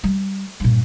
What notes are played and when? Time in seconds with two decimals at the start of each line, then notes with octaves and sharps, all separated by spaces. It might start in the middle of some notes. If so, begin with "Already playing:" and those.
0.04 G3
0.60 G2 A#2